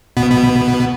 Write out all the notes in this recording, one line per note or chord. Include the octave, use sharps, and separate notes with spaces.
B2 B3
B2 B3